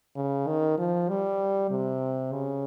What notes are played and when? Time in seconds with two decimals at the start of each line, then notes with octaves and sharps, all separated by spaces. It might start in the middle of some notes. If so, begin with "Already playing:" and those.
0.16 C#3
0.47 D#3
0.78 F3
1.09 G3
1.70 C3
2.33 C#3